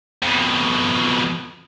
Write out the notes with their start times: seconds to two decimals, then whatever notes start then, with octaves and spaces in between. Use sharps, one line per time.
0.23 F2 B2